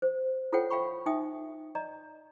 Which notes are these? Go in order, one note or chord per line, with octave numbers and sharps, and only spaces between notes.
C5
F4 A4 C5 C#5 F#5 G5
F5 G5 B5 C#6
D#4 E5 G5 D#6
D5 D#5 A#5